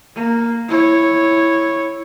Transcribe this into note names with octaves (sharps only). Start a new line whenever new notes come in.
A#3
E4 C#5